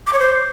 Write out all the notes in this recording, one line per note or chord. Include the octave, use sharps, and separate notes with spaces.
D6
C#5
C5